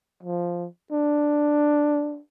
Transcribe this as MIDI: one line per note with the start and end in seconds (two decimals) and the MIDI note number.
0.23 0.67 53
0.92 2.20 62